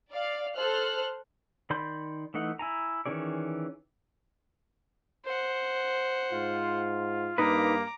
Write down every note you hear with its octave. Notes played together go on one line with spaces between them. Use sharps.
D5 F5
A4 C5 F6 F#6
D#3 D5 B5 C6 G6
E3 A3 D#4 F#5
E4 G#5 A#5
D#3 E3 C#4 G#4 D5
C5 F#5
G#2 F4
G2 A#3 D#4 B4 A#5 D6